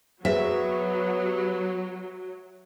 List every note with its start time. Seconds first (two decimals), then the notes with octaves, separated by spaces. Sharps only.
0.25 F#3 B3 G#4 B4 C5 E5
1.26 G4